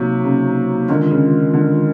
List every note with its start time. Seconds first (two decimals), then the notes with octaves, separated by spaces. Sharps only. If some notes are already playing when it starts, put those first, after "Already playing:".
Already playing: C3 F#3 A#3 D#4 F#4
0.24 C#3
0.89 D3 D#3 G#3 C#4 F4 A#4
1.11 C#3
1.54 D3